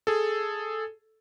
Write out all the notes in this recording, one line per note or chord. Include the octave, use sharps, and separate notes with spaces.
G#4 A4